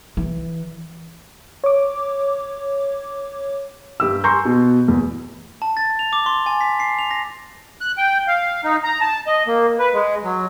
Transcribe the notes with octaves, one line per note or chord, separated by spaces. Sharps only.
E3
C#5 D6
G2 G4 E6
G#5 A#5 C6 C#6 G6
B2
E2
A5
A6
F7
D6
C6
G#5
B6
C7
F7
A#6
F#6
G5
F5
D#4
A#5
A5
D#5
A#3
B4
G#3
F#3